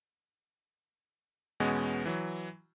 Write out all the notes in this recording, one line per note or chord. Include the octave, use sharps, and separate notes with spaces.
E2 B2 G#3 B3 C#4
E3 F#3